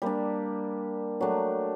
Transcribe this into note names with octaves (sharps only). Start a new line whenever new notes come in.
G3 A#3 D4
F#3 A3 D4